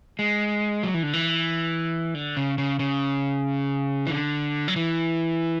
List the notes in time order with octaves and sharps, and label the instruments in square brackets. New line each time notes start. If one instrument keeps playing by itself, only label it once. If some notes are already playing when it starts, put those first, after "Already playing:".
[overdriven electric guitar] G#3
F#3
E3
D3
E3
D3
C#3
C#3
C#3
E3
D3
F#3
E3